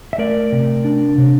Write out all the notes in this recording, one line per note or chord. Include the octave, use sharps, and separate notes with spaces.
E5
A3 A#4 D5
C3
D4
C3